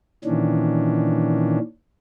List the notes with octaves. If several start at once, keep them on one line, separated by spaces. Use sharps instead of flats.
A#2 D#3 E3 C#4 D4